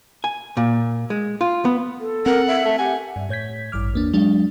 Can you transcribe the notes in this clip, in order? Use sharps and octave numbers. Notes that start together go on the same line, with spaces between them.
G#5
A#2
G#3
F4
B3
A4
C4 A#4 F#5
E5
A3 A4
G4 F#5 G#5
G2
A2 C#5 G6 G#6 B6
A1 G2 D6 F6
E2 A#3 D4
F#3 G#3 D4